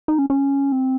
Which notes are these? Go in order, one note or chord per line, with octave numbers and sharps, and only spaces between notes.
D#4
C#4
C#4
C4